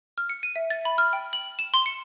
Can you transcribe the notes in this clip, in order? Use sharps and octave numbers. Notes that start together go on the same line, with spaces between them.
F6
C#7
D#7
E5
A6
B5
F6
G5
F#7
E7
C6
C#7